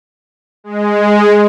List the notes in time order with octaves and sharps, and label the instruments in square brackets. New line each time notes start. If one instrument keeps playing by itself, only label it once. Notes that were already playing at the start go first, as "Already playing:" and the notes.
[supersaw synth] G#3